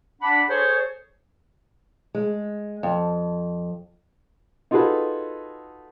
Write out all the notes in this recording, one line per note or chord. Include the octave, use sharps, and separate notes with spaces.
D4 F#5 B5
G#4 A4 C5 C#5
G#3
F2
D#4 F4 F#4 G#4 A4 B4